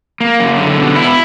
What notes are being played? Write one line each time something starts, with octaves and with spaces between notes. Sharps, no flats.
A#3
F#2
D3
B2
E4